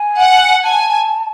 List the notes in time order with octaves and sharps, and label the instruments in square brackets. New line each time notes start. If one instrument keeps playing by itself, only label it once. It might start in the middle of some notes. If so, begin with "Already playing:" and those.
Already playing: [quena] G#5
[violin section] F#5
[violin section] G#5 [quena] A5